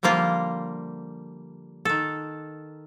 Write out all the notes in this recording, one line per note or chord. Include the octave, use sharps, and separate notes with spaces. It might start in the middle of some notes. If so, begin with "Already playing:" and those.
D3 F3 G3 A#3 F4
D#3 A4